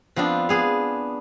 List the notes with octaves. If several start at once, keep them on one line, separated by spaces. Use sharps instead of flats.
F3 B3 C4 D4
B3 G#4 F5